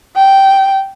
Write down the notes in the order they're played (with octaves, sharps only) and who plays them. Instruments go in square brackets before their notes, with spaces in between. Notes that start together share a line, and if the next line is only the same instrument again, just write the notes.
[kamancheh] G5